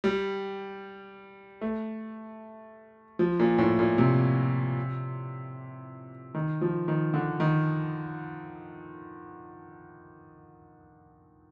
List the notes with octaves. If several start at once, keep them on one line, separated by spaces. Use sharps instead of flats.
G3
A3
F3
A#2
A2
A#2
C3
D#3
F3
D#3
D3
D#3